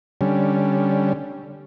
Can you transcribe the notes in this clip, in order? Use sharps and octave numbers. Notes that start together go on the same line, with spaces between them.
D3 G3 C#4